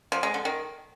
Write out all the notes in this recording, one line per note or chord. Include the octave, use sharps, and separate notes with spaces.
F3
G#3
D3
D#3